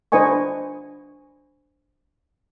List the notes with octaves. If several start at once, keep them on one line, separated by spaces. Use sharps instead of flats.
D4 B4 C5 D#5 G#5 C#6